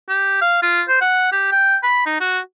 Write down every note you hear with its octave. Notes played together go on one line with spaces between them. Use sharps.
G4
F5
F4
C5
F#5
G4
G5
B5
D#4
F#4